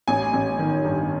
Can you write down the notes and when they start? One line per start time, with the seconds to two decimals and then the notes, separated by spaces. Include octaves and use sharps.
0.08 A1 G#5
0.33 A1
0.59 D#3
0.85 G2